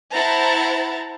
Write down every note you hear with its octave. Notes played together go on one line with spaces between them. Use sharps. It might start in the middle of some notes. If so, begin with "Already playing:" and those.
E4 C5 F#5 A5 A#5 A6